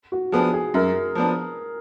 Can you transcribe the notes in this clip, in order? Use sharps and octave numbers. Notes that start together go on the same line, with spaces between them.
F#4
F3 B3 D4 G#4
G#4
F#2 A#4
F3 B3 D4